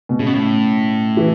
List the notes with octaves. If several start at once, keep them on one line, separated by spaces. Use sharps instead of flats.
B2
A2 C#3
B2
A2
E3